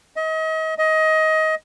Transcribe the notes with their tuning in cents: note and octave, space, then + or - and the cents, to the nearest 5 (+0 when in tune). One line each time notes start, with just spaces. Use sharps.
D#5 +35
D#5 +20